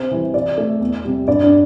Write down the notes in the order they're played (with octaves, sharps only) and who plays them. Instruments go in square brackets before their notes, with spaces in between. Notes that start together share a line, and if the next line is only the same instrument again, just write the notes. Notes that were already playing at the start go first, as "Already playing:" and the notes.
Already playing: [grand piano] C3 C5
E3 G3
C3 D5
A3
E2
C3 G3
G2 D5
D4